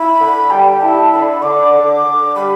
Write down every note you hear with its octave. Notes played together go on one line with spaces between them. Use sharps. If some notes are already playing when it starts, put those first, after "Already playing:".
Already playing: E4 B5
D3
G3 G5
E4 A5
D3 B5
D3 D6
D3
D3
G3 B5